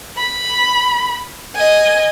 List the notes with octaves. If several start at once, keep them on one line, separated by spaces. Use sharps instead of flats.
B5
D#5 G#5